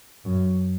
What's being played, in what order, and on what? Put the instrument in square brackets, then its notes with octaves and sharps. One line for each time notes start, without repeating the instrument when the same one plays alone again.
[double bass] F#2